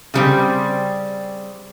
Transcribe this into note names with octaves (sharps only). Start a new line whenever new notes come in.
C#3 G3 C4